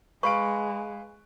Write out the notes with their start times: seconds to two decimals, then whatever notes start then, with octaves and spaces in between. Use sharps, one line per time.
0.23 G#3 B4 F5 C#6 D7